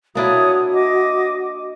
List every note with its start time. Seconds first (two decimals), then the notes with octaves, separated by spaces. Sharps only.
0.15 A#3 D4 E4 F#4 C#5 D#6
0.74 D#5 D6